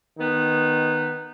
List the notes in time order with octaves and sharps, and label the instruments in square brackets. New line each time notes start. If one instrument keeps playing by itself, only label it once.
[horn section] D#3 B3 D#4